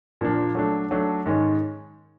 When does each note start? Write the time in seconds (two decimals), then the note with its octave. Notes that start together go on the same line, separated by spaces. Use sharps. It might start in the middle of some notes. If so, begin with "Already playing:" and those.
0.21 A#2 F3 A#3 D4
0.55 F#3 A3 D4
0.91 F#3 A3 D4
1.26 G#2 D#3 G#3 C#4